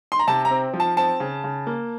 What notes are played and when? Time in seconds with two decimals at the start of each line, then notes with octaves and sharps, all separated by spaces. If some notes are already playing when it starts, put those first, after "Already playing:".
0.12 C6
0.19 A#5
0.28 C3 A5
0.45 A#5
0.51 C4
0.73 F3
0.80 A5
0.97 C4 A5
1.20 C#3
1.44 C#3
1.67 A#3